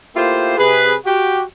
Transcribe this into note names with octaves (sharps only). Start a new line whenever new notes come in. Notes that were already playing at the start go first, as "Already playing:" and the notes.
A3 A#3 E4 F4 G4 C5
C3 G#4 B4
F#4 G4